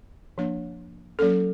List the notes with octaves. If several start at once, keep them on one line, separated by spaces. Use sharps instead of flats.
F3 A#3 D4
F#3 A#3 C#4 A4